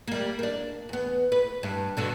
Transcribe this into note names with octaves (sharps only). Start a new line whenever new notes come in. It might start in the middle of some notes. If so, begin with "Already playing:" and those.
G3 A#3
A#3 D4
E2 B3
B4
G2
G2 B2 D3